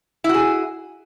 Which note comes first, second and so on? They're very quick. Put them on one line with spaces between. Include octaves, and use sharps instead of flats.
E4 F#4 G#4